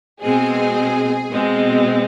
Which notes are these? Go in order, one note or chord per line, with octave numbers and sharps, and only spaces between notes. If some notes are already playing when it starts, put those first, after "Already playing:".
B2 G#3 C4 G#4
B2 G#3 C4